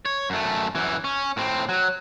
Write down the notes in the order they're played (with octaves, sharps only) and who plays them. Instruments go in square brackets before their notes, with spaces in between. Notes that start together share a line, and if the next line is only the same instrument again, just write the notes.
[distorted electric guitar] C#5
F#2 A3
F#2 E3
C#4
A2 C4
F#3